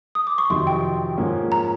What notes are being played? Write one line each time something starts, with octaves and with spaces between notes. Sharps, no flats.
D#6
D6
C#6
F2 C3 D#3 F#3 C6
G5
G#2 F3 A#3 C#4
A#5